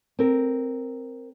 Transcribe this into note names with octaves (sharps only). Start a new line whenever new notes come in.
C4 A#4